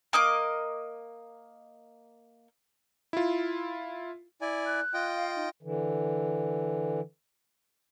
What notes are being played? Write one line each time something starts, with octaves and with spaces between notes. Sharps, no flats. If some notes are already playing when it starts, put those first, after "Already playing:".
A#3 D#5 D6
E4 F4
E4 D5 G#5
F#6
F4 D#5 G5
F5
D#4
D3 E3